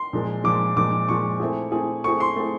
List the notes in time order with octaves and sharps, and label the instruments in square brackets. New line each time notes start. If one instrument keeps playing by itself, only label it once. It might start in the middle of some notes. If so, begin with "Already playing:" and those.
Already playing: [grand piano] C6
[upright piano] A#2 F3 G#3
[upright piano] A#2 F3 G#3 [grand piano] D6
[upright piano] A#2 F3 G#3 [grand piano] D6
[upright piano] A#2 F3 G#3 [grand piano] C#6
[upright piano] A3 C4 E4 G#4
A3 C4 E4 G#4
[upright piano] A3 C4 E4 G#4 [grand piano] C#6
[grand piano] C6
[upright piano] A3 C4 E4 G#4